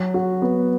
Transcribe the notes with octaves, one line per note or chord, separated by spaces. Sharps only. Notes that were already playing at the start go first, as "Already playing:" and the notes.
Already playing: F#3
F#4
B3